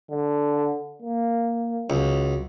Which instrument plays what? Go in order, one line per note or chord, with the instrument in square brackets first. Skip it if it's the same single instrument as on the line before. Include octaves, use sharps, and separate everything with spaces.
[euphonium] D3
A#3
[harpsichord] C#2 [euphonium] F#3